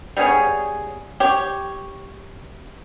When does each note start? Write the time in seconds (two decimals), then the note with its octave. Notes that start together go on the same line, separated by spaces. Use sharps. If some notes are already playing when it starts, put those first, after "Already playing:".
0.17 G3 B3 G#4 C#5
1.20 G4 C#5